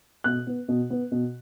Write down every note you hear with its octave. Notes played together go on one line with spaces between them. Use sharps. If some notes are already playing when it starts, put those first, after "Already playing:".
B2 F#6
B3
B2
B3
B2